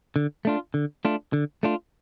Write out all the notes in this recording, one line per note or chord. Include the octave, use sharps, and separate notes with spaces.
D3
A3 D4 F4
D3
A3 D4 F4
D3
A3 D4 F4